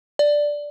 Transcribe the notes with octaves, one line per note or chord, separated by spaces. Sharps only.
D5